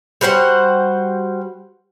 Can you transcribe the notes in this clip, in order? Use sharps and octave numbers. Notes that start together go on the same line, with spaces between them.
G3 F#4 C5 F#5